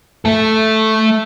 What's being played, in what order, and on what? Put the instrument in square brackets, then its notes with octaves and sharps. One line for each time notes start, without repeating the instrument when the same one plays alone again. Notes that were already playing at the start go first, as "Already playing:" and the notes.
[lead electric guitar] A3 A4